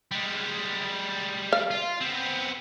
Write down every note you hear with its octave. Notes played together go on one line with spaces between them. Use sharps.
G3 G#3
F5
F4
B3 C4